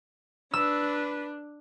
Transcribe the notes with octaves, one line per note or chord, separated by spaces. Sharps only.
D4 B4 E6